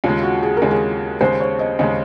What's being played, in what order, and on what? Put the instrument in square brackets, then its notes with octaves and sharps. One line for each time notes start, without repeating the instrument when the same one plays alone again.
[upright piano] D#2 C#3 G#3 [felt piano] F4
[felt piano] F#4
G#4
A#4
[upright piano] D#2 C#3 G#3
[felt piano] G#4
[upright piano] D#2 C#3 G#3 [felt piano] C5
[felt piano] C#5
D#5
[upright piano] D#2 C#3 G#3 [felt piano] D#5